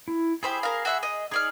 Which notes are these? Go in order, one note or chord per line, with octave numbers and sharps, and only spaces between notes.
E4
G4 G#4 C5 E5 B5 D#6
A#4 F5
F#4 E5 F#5
D#5
D#4 G#4 D5 D#6 F6